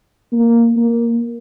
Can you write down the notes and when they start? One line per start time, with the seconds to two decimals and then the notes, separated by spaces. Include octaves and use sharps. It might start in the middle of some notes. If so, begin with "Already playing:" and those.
0.32 A#3
0.76 A#3